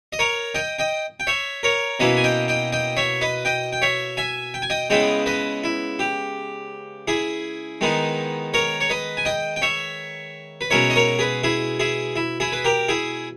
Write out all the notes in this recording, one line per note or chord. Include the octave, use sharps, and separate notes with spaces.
D#5
A#4 C#5
D#5 G5
D#5 G5
G5
C#5 E5
A#4 C#5
B2 A#3 C#4 E4 B4 D#5
G#5
D#5 G5
D#5 G5
D#5 G5
C#5 E5
B4 D#5
D#5 G5
G5
C#5 E5
E5 G#5
G5
G#5
D#5 G5
C#3 G#3 B3 E4 D#5 G5
B4 D#5
E4
G4
E4 G#4
D#3 G#3 B3 D#4
A#4 C#5
C#5
B4 D#5
G#5
D#5 G5
G5
C#5 E5
B4
B2 G#3 C#4 E4 A#4 C#5
D#5
A#4 C#5
G#4 B4
E4 G#4
E4 G#4
E4
E4 G#4
B4
G4 A#4
E4 G#4